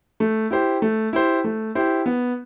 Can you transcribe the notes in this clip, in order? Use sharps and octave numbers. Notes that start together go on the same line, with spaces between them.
A3
E4 G4 C5
A3
E4 G4 C5
A3
E4 G4 C5
B3